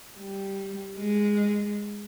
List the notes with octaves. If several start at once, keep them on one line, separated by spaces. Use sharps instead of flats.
G3
G#3